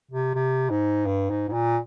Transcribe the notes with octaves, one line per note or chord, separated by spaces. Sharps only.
C3
C3
G#2
G2
G#2
G#2
A#2